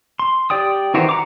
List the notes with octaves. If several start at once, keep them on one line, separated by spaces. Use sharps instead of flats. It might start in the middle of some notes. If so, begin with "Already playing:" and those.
C6
G4 D5 G5 D#6
D#3 E3 F#4 G4 C5
F#5 A#5 D6